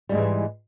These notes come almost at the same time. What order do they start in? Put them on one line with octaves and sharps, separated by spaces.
G3 G#2 G#3 E3